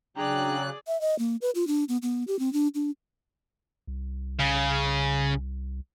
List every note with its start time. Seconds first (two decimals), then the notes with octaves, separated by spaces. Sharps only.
0.17 C#3 F#3 D4 G#4 D5 G5 A#5 F#6
0.87 E5
1.01 D#5
1.19 A#3
1.42 B4
1.55 F4
1.67 D4
1.89 B3
2.03 B3
2.28 G4
2.39 C4
2.53 D4
2.75 D4
3.87 C2
4.40 C#3